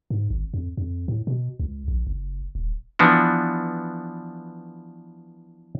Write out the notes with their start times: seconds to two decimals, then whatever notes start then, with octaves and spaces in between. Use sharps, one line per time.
0.10 G#2
0.30 G#1
0.54 F2
0.77 F2
1.08 A2
1.27 B2
1.60 C#2
1.88 A#1
2.07 F#1
2.55 D#1
2.99 E3 F3 B3 D4 F#4